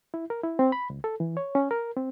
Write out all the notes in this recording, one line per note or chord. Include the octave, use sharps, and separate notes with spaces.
E4
A#4
E4
C4
B5
C#2
A4
E3
C#5
C#4
A#4
C4